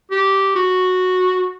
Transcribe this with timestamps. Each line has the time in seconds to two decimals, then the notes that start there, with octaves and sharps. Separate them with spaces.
0.11 G4
0.56 F#4